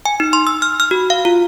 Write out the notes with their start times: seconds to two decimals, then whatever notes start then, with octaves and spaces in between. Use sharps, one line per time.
0.05 G#5
0.20 D#4
0.33 C6
0.47 E6
0.62 F6
0.80 F6
0.91 F#4
1.10 F5
1.25 F4